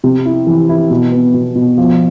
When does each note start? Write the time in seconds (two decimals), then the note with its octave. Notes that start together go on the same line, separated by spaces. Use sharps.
0.04 C3
0.26 E4
0.47 E3
0.69 E4
0.91 B2
1.12 B3
1.34 B2
1.56 B2
1.78 F3